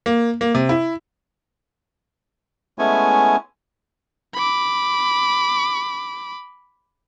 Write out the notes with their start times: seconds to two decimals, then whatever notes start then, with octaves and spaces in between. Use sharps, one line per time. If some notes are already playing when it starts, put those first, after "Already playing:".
0.06 A#3
0.41 A#3
0.55 C3
0.69 E4
2.79 G#3 A3 B3 C#4 E4 G#5
4.34 B5 D6